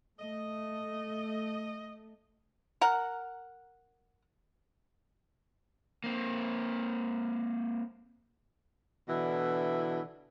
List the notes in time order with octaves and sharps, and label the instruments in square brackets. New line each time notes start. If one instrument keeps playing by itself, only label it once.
[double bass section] A3 [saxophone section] D#5
[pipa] A#4 F#5
[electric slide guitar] A#3 C4
[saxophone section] B2 D3 E3 D4 E4